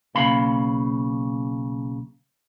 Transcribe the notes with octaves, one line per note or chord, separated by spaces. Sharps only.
B1 C#3 A#3 F5 B5 C6